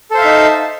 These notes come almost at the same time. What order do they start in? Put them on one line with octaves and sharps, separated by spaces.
A4 C5 F5 E5 D#4